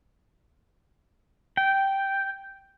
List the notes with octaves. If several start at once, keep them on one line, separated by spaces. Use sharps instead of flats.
G5